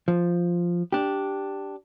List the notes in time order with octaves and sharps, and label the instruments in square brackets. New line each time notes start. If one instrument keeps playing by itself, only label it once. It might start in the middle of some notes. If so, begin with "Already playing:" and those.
[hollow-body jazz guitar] F3
D4 G4